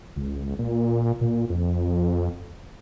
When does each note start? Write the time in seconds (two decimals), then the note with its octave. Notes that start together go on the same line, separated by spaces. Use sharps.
0.16 C#2
0.59 A#2
1.21 A#2
1.49 F2